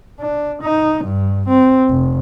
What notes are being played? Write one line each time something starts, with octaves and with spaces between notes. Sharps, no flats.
D4
D#4
G2
C4
F1